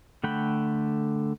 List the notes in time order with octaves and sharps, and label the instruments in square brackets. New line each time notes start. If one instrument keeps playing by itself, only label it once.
[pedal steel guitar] D3 A3 F#5 G5 B5